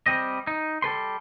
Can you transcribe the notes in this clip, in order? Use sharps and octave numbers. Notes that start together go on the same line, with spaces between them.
G3 C4 D#5
D#4
G3 A4 B4 C6